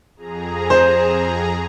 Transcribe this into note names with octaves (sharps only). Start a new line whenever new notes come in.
F2 G#4 A#5
C5